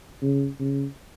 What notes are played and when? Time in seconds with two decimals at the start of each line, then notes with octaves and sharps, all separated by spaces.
0.22 C#3
0.59 C#3